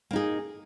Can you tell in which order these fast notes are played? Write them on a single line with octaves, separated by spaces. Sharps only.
A#3 D#4 G#4